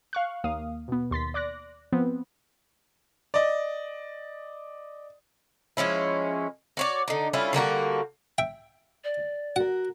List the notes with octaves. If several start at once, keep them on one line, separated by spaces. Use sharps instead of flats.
F5 C#6 F#6
D#2 A#3 F5 D#6
B2 B3
D#2 C6 A6 B6
D5 D6 F#6 A#6
F3 B3 C4
D5 D#5
F3 G#3 C#4 E4
F#4 C#5 D5
D3 D#4
G3 C#4 E4 F4
D3 G3 A#3 F#4
E5 G5
D5
F#4 A#4 F#5